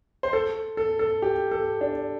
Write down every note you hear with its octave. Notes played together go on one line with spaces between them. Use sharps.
C5
A4
A4
A4
G4
A4
D4